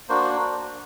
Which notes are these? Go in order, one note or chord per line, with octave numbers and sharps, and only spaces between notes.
A#3 D4 F#4 C5